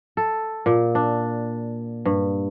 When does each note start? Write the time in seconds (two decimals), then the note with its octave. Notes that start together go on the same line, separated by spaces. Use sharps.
0.17 A4
0.66 A#2
0.95 D4
2.05 G2